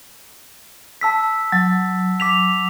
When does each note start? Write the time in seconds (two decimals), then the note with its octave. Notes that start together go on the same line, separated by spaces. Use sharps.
1.01 A5 E6 B6
1.52 F#3
2.20 D6 B6 F7